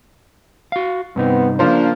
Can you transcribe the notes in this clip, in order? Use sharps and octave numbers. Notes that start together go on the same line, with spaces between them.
F#4 F5
G2 C3 B3 C4 D#4
C#3 F3 A#3 D4 C5